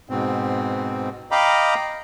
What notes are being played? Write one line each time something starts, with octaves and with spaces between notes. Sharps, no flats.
G#2 B2 C4
D#5 F5 G5 A#5 B5 D6